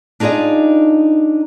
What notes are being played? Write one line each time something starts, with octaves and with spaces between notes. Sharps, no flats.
D4 D#4 F4 G#4 D5 D#5